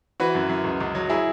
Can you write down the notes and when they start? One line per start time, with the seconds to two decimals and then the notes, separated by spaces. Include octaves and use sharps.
0.20 E3 F#4 B4
0.35 F#2
0.49 F#2
0.64 C#2
0.81 C#2
0.95 F#3
1.09 E4 G#4